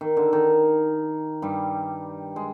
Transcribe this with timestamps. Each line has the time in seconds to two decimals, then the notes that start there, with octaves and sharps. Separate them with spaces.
0.01 D#3
0.17 D3
0.33 D#3
1.42 G2 G3
2.36 G#3